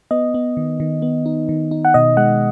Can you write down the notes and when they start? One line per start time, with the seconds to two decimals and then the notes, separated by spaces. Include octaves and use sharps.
0.11 B3 D#5
0.34 B3
0.57 D#3
0.80 D#3
1.02 B3
1.26 D#4
1.49 D#3
1.71 D#4
1.85 F#5
1.94 B2 D#5
2.17 G#3 F#5